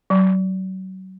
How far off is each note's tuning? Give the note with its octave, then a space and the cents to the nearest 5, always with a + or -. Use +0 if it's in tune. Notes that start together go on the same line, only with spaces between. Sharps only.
F#3 +30